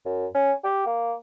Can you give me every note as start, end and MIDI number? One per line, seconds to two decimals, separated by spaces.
0.06 0.27 42
0.35 0.53 61
0.64 0.83 67
0.86 1.15 58